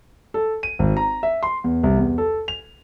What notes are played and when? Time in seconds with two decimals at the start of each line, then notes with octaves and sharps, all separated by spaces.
0.34 A4
0.63 D#7
0.79 G#1
0.97 A#5
1.23 E5
1.43 C6
1.64 E2
1.83 C2
1.98 E2
2.18 A4
2.48 F7